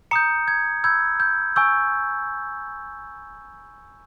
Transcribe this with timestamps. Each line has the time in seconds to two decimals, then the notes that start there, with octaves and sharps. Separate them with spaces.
0.11 A#5 D#6 G6 C#7
0.48 G#6
0.84 B5 E6 G6 G#6
1.20 G6
1.56 G#5 C#6 E6 G6